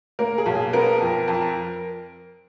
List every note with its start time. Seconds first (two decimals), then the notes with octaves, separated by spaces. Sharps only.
0.19 A#3 A#4
0.38 G#4
0.46 B1
0.55 G#4
0.73 B3 A#4
1.00 F2
1.28 F2